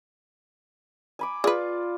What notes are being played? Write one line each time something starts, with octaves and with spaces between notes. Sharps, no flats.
G#5 B5 D6
F4 G#4 B4 D5